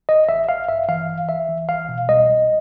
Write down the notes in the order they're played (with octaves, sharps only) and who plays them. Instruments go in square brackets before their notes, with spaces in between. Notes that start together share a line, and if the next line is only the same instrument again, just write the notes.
[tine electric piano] A1 D#5
A1 E5
A1 F5
G2 E5
E3 F5
A1
A1 E5
E3
C2 F5
B2
C2 D#5
C2